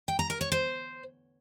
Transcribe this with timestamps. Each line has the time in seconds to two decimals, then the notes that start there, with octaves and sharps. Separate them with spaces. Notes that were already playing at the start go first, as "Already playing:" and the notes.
0.08 G5
0.19 A#5
0.30 A#4
0.41 C#5
0.52 C5